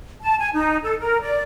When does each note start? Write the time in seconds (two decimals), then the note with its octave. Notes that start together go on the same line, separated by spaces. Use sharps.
0.21 A5
0.38 G#5
0.54 D#4
0.84 A4
1.00 A#4
1.21 D5